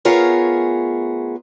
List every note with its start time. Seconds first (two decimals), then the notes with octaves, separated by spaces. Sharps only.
0.05 A3 B3 F4 G#4 A#4 C#5